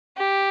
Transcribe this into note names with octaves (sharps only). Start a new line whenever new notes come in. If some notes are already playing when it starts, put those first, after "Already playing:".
G4